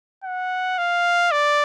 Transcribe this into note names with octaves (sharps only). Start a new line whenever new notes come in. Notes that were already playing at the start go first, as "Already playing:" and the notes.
F#5
F5
D5